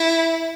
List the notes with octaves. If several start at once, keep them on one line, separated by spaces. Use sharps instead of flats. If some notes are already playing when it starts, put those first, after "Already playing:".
Already playing: E4